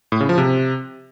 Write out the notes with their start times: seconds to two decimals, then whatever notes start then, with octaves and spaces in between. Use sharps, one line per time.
0.12 A2
0.21 C#3
0.29 F3
0.38 C3